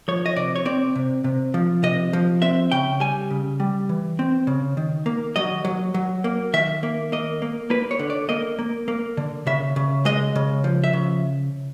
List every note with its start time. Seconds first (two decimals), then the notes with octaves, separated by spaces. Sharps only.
0.08 F3 C#5
0.26 D#5
0.36 C3 D5
0.56 C#5
0.65 C4 D5
0.95 C3
1.24 C3
1.54 F3
1.83 C3 D#5
2.13 F3
2.42 C4 E5
2.72 C#3 G5
3.00 G3 G#5
3.31 C#3
3.60 G3
3.89 E3
4.19 C4
4.47 C#3
4.77 D#3
5.06 A#3
5.36 F#3 D#5
5.65 F#3
5.94 F#3
6.24 A#3
6.53 D#3 E5
6.83 A#3
7.12 A#3 D#5
7.42 A#3
7.70 A#3 B4
7.91 C#5
7.99 D3
8.10 D5
8.29 A#3 D#5
8.59 A#3
8.88 A#3
9.17 D3
9.46 C#3 E5
9.76 C#3
10.05 G#3 D#5
10.35 C#3
10.64 F3
10.84 E5
10.93 C#3